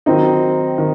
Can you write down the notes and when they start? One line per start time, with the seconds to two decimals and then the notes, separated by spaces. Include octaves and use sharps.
0.06 D#3 F#3 C4 D#4 D#5
0.78 D#3